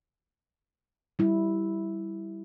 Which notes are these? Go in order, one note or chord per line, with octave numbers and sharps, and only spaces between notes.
G3 E4